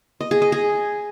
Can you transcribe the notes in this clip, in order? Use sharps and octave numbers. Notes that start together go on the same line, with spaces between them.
D#5
G#4
D#5
G#4